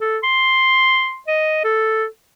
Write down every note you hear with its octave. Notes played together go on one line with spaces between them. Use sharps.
A4
C6
D#5
A4